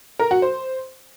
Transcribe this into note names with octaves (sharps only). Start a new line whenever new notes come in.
A#4
F#4
C5